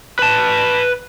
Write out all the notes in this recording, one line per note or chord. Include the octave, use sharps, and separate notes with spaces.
B4 A5